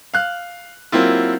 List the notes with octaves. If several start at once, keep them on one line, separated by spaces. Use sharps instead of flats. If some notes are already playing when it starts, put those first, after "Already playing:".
F5 F#6
F#3 A#3 C4 E4 F4